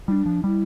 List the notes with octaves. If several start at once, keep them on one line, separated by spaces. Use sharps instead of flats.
G3 D4 E4
F3
G3 E4